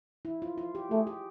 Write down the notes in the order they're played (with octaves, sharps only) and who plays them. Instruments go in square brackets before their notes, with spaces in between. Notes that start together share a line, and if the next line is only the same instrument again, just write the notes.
[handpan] E4
F4
F4
G4
[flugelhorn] A3 [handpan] G#4
[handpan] G4